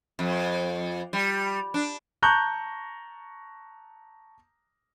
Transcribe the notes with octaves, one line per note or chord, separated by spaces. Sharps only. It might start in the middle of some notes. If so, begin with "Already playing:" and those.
F2
G3
D4
A5 A#5 C#6 F#6 G6